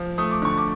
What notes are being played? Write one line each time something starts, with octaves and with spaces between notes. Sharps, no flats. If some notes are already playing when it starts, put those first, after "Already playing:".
Already playing: F3
A3 D#6
D6
D3 C#6
D6